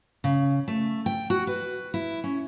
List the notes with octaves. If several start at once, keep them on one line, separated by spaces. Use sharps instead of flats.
C#3
A3
G5
F#4
B4
E4
C#4